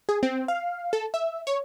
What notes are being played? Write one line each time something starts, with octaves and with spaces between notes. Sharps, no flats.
G#4
C4
F5
A4
E5
C#5